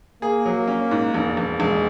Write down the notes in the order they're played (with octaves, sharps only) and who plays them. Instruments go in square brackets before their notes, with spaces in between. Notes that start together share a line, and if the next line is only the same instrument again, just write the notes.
[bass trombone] A#3 [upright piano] G#4
[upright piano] F#3
C#4
G#2
E1
E1
[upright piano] E1 [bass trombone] G#3